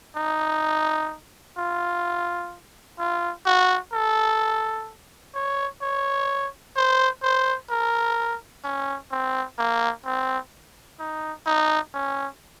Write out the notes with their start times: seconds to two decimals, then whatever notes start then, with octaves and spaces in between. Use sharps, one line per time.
0.16 D#4
1.58 F4
2.99 F4
3.46 F#4
3.93 A4
5.34 C#5
5.82 C#5
6.76 C5
7.23 C5
7.70 A#4
8.64 C#4
9.11 C4
9.58 A#3
10.05 C4
10.99 D#4
11.47 D#4
11.94 C#4